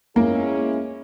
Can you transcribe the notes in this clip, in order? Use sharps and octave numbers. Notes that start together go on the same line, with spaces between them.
G#3 A#3 C#4 E4